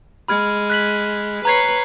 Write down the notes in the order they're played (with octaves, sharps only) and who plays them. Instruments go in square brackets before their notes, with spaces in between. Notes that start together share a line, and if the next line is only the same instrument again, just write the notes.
[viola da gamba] G#3 [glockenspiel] B5 F6 G#6
[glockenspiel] F#6 B6 F#7
[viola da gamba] B4 C#5 [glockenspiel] A#5 G#6 C7